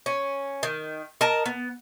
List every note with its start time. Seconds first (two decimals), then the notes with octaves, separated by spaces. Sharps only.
0.06 C#4
0.63 D#3
1.21 A#4 D#5 A5
1.46 B3